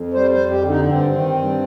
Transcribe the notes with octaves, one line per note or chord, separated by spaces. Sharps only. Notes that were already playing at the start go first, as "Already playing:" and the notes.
Already playing: F2
G3 C5
C5
F2
G4
D3
D#4
G2 C4
D#3
G2